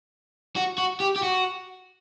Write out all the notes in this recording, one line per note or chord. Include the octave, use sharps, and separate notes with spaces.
F#4
F#4
G4
G4
F#4